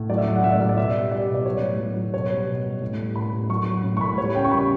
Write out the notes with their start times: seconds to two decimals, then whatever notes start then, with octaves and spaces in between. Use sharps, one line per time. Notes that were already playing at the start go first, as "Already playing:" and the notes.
Already playing: A2
0.10 F#3 D5
0.18 E5
0.26 F#3
0.36 F#5
0.43 A2 E5
0.52 D5
0.61 F#3 E5
0.69 D5
0.78 B2 E5
0.95 G3
1.12 G3 D5
1.29 B2
1.34 D5
1.45 F#3 C#5
1.63 A2
1.80 F#3
1.97 F#3
2.13 B2 C#5
2.31 G3
2.47 B2
2.65 G3
2.82 A2
2.99 G3
3.15 A2 B5
3.33 A2
3.49 F#3 C#6
3.67 F#3
3.84 A2
3.97 C#6
4.01 A2 B5
4.18 G3 C#5
4.35 C#3 G5
4.45 C#6
4.52 G3 B5